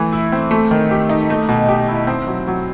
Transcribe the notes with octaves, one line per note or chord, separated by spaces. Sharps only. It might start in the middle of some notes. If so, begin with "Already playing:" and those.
Already playing: E3 A3
E4
C4
A3
D#3
G4
D#4
A3
B2
G4
E4
C4
F#3
F#3